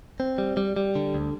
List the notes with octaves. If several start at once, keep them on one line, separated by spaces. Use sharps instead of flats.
C4
G3
G3
G3
D3
D2